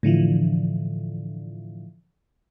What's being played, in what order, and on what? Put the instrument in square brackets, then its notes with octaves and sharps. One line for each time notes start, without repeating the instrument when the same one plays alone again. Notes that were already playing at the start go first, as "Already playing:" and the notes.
[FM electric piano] A2 D3 E3 F3